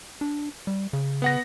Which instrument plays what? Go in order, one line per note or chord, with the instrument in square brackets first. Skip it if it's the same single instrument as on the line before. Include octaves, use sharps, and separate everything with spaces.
[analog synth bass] D4
G3
C#3
[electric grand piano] B3 F#5 A#6